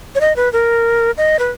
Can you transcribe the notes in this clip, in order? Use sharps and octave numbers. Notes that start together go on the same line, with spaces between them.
C#5
D#5
B4
A#4
D#5
B4